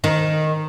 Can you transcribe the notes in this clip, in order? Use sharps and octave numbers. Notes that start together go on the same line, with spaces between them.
D#3